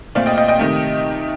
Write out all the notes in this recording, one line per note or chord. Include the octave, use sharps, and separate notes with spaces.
A#2 A3 C4 D5 F5
D#5 G5
D#5 G5
D#5 G5
C3 D#3 A3